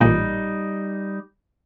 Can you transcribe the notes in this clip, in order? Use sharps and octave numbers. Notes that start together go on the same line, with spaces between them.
A1 A#2 G3 D#4